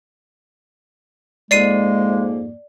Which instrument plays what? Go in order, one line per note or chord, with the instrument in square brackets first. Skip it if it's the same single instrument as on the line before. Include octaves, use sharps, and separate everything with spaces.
[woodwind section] F2 G#2 A#3 [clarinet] G#3 [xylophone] D5 C7 D#7